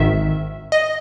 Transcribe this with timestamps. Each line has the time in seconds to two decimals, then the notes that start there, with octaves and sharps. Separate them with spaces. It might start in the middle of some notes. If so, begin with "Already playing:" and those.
Already playing: G#1 G#2 D#3 E5
0.72 D#5